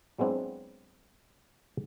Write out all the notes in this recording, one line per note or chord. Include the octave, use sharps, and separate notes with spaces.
F#3 G#3 B3 C4 D4 E4